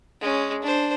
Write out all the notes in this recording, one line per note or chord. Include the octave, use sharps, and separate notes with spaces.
G#3 C#4
D4 C5